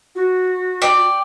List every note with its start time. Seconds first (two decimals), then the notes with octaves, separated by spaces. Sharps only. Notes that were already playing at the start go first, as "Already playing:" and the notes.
0.16 F#4
0.82 D5 G5